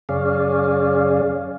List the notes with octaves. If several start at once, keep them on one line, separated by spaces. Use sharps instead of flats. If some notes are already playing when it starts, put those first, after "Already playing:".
F#2 C#3 G#4 C#5 D5 F5